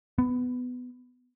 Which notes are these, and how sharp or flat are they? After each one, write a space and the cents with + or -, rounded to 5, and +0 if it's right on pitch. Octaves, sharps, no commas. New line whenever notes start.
B3 +15